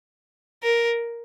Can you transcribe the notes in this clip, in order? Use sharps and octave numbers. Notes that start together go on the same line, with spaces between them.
A#4